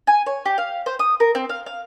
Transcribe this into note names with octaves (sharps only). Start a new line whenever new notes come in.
G#5
C#5
G4
F5
C5
D#6
A#4
C4
F5
F5